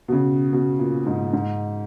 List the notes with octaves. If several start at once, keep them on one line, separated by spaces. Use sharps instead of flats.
B2
C#3
B2
A#2
G#2
G#2